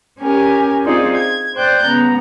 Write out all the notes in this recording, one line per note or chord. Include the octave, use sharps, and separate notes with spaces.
C#4 G4 A#4 G#5
C4 D#4 F4 G#4 C5 D5
G#6
C5 D5 G5 F#6 G6 A6
C#3 B3 A#5